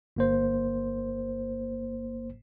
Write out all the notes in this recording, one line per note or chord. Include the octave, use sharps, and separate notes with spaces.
G1 A#3 C5